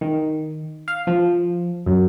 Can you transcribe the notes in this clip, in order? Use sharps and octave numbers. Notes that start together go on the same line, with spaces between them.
D#3
F5
F3
F#2